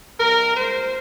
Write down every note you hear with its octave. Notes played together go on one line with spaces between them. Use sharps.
C3 G3 A#4
A#2 G#3 C5